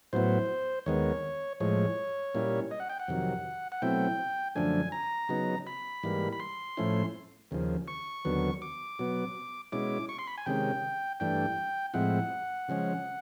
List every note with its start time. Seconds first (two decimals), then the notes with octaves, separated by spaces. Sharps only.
0.13 A2 F#3 B3 E4 C5
0.86 D#2 D#3 G#3 B3 C#5
1.60 A2 F3 G#3 C#5
2.35 A#2 G3 A#3 C#4 E4
2.71 D#5
2.80 F#5
2.89 G5
3.00 F#5
3.08 F2 C3 D#3 F#3
3.72 F#5
3.82 B2 F#3 A3 C4 E4 G5
4.56 F#2 D3 F3 A3 D4 G#5
4.92 A#5
5.29 C#3 F#3 B3 D#4
5.67 B5
6.03 G#2 E3 G3 A#3
6.33 B5
6.40 C6
6.77 A2 F3 A3 C#4 E4
7.51 D#2 C#3 F3
7.88 C#6
8.25 D#2 D3 F#3 B3
8.62 D6
8.99 B2 F#3 B3
9.72 B2 G#3 C#4 E4 D6
10.09 C#6
10.19 C6
10.27 B5
10.38 G#5
10.46 C3 D#3 G#3 C#4 G5
11.20 G2 E3 A3 D4 G5
11.94 A2 F3 G#3 C4 E4 F#5
12.68 C#3 F3 G#3 C#4